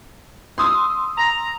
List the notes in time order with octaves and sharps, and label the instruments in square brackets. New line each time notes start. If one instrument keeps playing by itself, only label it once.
[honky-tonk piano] C6 D#6 E6
[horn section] A#5